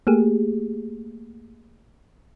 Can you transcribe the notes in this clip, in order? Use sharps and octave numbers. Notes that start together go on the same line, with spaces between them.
A3 A#3 G4 G#4